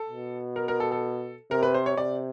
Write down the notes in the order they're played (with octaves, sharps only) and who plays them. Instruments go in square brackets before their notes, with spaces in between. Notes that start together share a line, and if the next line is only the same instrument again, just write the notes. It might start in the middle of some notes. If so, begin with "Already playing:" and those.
Already playing: [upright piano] A4
[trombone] B2
[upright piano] A#4
A#4
A4
A4
[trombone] C3 [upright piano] A#4
[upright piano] B4
C5
C#5
[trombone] C3 [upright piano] D5